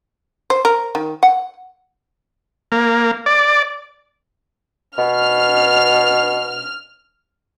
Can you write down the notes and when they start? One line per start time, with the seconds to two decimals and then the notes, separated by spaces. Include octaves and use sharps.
0.50 C5
0.65 A#4
0.95 D#3
1.23 F#5
2.72 A#3
3.26 D5
4.98 B2 F6